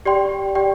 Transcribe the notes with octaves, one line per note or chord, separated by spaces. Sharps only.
G4 D5 G5 C6
G4 D5 G5